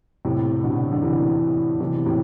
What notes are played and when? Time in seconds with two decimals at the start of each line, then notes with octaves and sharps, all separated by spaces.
0.25 A2 C3
0.64 B2 D3
0.92 D3
1.02 C3 E3
1.80 C3 E3
2.06 A2 C3